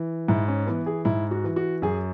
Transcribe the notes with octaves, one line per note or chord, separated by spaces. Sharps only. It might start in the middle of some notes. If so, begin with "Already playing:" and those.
Already playing: E3
G#2 E4
C#4
E3 B3
G#4
G#2 E4
F#4
E3
F#4
F#2 G#4